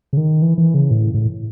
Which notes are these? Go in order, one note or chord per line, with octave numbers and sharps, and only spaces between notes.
C#3
D#3
E3
E3
C#3
A2
A2